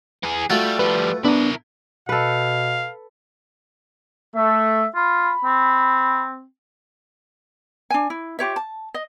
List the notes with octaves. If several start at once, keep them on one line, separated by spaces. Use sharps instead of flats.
E3 G#4
G3 A3 F4 F#4
F3 G3 B4
B3 D4 E4 A#4
B2 A4 B4 F5
A3 E5
F4 B5
C4
D4 G#5
E4
F4 G4 C#5 E5
A5
D#5